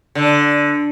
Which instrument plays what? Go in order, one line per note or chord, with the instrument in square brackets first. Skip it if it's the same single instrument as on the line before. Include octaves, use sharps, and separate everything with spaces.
[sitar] D3